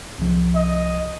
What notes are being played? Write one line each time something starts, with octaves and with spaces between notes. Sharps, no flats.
C2 F3
D#5